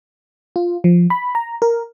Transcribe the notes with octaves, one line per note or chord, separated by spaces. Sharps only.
F4
F3
B5
A#5
A#4